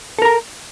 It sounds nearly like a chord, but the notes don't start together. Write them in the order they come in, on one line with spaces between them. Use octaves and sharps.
A4 A#4 A#5